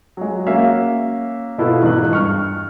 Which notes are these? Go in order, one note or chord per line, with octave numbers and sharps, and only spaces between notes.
F#3 G#3
A#3 C#4 F#4 C#5 E5 F5
B2 E4 F4 A4 B4
E1 E2 G#2 D#4 F#6
G2 C#6 F6